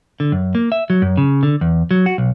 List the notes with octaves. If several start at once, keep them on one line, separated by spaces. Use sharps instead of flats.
D3
F#2
A#3
E5
F#3
F#2
C#3
D3
E2
F#3
F#4
B1